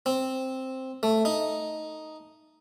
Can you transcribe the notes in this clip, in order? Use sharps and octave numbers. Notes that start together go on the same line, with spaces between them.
C4
A3
D#4